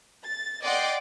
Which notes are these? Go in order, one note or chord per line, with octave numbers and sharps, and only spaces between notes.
A6
D5 D#5 F#5 G5 C6 D6